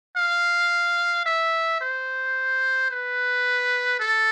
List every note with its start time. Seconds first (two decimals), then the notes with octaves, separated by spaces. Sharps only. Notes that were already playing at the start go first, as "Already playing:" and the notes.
0.17 F5
1.26 E5
1.81 C5
2.91 B4
4.00 A4